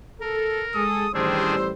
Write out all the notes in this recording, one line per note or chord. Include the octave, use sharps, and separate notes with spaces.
A4 A#4
G#3 G#4 A4 D#6
A1 D#3 G3 D4 G#4 C5 E6